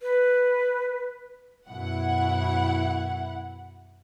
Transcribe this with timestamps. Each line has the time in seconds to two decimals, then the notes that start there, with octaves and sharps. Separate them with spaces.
0.02 B4
1.69 F#2 B2 E4 F#5